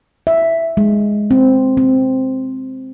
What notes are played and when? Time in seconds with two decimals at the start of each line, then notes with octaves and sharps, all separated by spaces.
0.27 E5
0.77 G#3
1.31 C4
1.77 C4